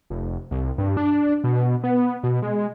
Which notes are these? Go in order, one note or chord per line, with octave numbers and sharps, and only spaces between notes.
F1
C2
G2
D4
B2
B3
B2
G#3